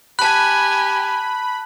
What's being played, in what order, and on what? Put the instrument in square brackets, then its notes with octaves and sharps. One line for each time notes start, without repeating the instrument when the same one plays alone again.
[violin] G4 G#5 [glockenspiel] A5 F#6 [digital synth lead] B5